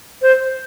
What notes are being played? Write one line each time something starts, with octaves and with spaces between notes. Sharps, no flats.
C5